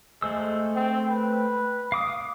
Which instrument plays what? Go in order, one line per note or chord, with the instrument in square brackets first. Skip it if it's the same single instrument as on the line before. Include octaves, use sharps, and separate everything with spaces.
[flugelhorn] G#3 [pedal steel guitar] A3 C5 E6
[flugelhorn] C4
B4
[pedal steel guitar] F5 D6 D#6